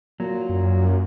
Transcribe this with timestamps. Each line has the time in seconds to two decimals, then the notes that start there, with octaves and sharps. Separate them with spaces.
0.20 A#2 F#3
0.49 F#2